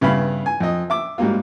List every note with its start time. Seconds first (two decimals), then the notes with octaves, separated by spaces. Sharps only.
0.01 G2 C#3 B3 E4 F5 B5
0.46 G#5
0.60 F2 D#5
0.90 E5 D6
1.18 G#2 F#3 G3 A#3 F4